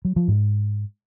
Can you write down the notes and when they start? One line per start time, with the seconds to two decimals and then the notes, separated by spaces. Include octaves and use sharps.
0.05 F#3
0.16 F3
0.28 G#2